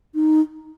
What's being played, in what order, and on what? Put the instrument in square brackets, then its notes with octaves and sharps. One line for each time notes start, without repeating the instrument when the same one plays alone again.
[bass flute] D#4